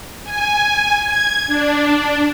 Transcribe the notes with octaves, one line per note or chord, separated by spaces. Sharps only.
G#5
G#6
D4